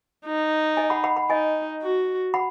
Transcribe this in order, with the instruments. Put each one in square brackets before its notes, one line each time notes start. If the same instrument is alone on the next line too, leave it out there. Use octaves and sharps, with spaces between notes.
[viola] D#4
[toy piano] D#5 G#5
F#5 B5
F#5 B5
F#5 B5
[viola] D#4 [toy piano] D#5 G#5
[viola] F#4
[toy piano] F#5 B5